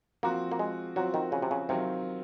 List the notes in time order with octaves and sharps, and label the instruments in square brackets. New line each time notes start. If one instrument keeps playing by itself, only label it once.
[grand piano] F3 C4 F#4 [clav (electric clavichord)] A#3
[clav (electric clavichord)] A#3
G#3
[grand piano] F3 C4 F#4 [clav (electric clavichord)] F#3
[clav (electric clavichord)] D#3
C#3
C3
C#3
[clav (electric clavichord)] C3 [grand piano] D#3 F#3 C4 F4